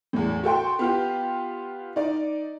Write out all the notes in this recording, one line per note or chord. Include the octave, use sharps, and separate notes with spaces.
E2 A2
F#4 A4 G5 C6
B3 F4 G4
D#4 D5